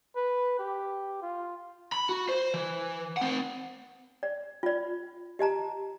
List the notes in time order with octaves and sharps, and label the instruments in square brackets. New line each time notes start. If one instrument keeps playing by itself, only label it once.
[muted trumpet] B4
G4
F4
[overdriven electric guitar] B5
F#4
C5
E3
C4 F#5
[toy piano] D5
F4 D5
G4 D#5 A5 A#5